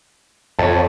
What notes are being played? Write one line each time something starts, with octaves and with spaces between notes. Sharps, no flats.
F2 C#5 A5